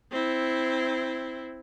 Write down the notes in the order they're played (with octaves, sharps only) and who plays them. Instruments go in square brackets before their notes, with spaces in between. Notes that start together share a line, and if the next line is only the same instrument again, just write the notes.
[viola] C4 E4